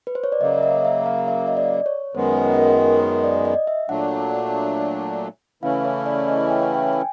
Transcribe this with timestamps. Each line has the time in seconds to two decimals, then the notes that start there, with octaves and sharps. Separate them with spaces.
0.07 B4
0.15 C5
0.24 C#5
0.32 D5
0.41 C#3 F#3 A#3 D#5
0.58 E5
0.63 D#5
0.85 E5
1.06 F5
1.28 E5
1.47 D#5
1.57 D5
1.86 C#5
2.15 F#2 D#3 G#3 B3 C5
2.37 B4
2.58 A#4
2.80 A#4
3.02 B4
3.23 D5
3.45 D#5
3.67 E5
3.89 A#2 F#3 A3 D4 F#5
5.63 C#3 E3 A3 C#4 E4 F5
5.85 C#5
6.06 D5
6.28 D#5
6.50 G5
6.62 F#5
6.74 G5
6.93 G#5